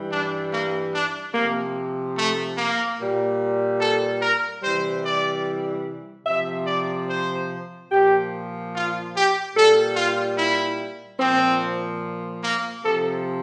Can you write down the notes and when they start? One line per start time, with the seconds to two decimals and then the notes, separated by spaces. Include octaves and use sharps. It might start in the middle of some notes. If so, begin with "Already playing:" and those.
Already playing: G2 E3 G3
0.10 D4
0.51 A#3
0.93 D4
1.34 C3 F3 A#3
2.16 A3
2.57 A#3
2.98 A#2 G3
3.79 A4
4.22 A#4
4.62 C3 E3 G3 C5
5.03 D5
6.26 C3 F3 E5
6.67 D5
7.08 C5
7.90 A#2 F3 G4
8.73 F4
9.13 G4
9.55 A#2 G3 A4
9.96 F4
10.37 E4
11.19 A#2 F3 C4
12.42 A#3
12.83 C3 F3 A4